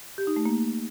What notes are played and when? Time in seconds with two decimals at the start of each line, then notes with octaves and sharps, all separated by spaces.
0.18 G4
0.27 D#4
0.36 A3
0.46 A#3